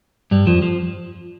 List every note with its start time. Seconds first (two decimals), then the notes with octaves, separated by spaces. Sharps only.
0.31 G2 G3
0.47 F2 F3
0.62 F3